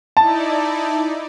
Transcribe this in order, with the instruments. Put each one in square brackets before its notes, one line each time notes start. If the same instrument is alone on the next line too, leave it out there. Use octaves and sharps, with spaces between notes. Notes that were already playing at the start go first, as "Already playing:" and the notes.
[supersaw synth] D#4 E4 D5 [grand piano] A5